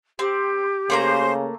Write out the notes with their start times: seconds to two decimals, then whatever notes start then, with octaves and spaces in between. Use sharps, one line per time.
0.19 C4 G4
0.90 C#3 A3 A#3 C5 A#5